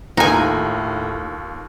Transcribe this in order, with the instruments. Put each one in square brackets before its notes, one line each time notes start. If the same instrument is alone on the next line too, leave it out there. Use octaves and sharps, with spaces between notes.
[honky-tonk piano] D#2 [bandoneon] A2 [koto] D#4 G#5 [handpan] F4 G4 A4